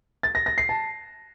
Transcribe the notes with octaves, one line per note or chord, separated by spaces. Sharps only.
A6
A#6
A#6
C7
A5